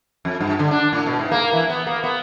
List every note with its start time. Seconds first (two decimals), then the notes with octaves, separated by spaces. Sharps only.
0.25 F2
0.41 G2
0.59 D3
0.71 D4
0.93 A2
1.06 B2
1.19 G#2
1.31 A#3
1.53 E3
1.69 B3
1.87 A#3
2.04 B3